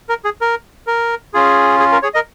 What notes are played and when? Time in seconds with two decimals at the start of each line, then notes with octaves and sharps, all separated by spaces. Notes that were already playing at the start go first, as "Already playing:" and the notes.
0.09 A#4
0.25 G#4
0.41 A#4
0.87 A#4
1.34 C#4 F4 G#4
1.80 G#4
1.92 A#4
2.03 G#4 C#5
2.14 A#4 D#5